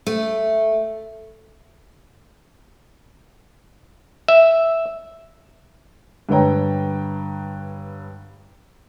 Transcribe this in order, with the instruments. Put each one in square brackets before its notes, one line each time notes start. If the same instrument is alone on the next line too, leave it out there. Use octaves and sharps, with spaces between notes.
[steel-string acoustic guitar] A3
[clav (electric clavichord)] E5
[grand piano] G2 D3 B4 C#5 G5 A#5